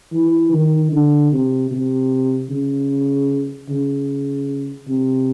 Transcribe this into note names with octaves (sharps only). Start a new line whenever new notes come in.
E3
D#3
D3
C3
C3
C#3
C#3
C3